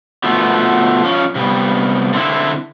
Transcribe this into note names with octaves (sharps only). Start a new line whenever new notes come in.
B2 F3 A3 B3
F3 C#4
C3 G3 B3
D3 C4 E4